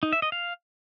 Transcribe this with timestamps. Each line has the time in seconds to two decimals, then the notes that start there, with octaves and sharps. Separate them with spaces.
0.03 D#4
0.13 E5
0.22 D#5
0.32 F5